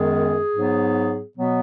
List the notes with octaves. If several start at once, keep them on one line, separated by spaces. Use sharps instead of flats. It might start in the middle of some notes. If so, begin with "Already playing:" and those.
Already playing: F#2 D#3 G#3 B3 G#4
G#2 F#3 B3
B2 F#3 B3